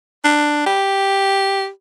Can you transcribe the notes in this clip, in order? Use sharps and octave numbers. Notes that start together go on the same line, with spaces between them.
D4
G4